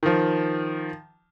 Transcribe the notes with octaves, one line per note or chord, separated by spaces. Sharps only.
D#3 F3